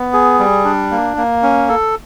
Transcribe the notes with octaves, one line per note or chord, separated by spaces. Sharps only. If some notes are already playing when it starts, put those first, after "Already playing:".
Already playing: B3
G#4
G3
D4
A#3
A#3
C#4
A4